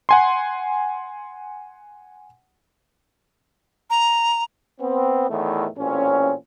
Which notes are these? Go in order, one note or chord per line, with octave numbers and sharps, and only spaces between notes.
F#5 G#5 C6
A#5
B3 C4
E2 A2 D#3 E3 A3
A1 A#2 C4 C#4